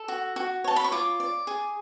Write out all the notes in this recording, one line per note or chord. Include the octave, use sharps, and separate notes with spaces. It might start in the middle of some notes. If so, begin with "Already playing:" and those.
Already playing: A4
F#4
F#4
C#5 A5
B5
C#6
F4 D6
D5
G#4